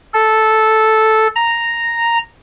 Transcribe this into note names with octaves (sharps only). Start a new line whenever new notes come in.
A4
A#5